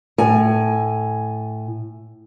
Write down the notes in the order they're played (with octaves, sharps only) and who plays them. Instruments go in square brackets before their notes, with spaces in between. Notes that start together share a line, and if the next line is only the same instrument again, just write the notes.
[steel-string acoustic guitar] A2 G#5